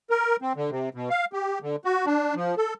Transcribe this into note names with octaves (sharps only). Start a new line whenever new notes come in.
A#4
C4
D3
C3
B2
F5
G4
D3
F#4
D4
F3
A4